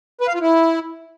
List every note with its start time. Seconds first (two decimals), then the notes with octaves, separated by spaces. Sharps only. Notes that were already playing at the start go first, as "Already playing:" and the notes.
0.21 B4
0.28 F5
0.34 F4
0.41 E4